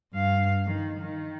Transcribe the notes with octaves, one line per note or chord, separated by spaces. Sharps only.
G2 F5
D#3
D#3